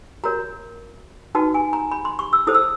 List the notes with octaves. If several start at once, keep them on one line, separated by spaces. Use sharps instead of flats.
F#4 A#4 C#5 A#5
D#4 F#4 B4 A5
G#5
A#5
B5
C6
C#6
E6
E4 A4 C5 D#6
E6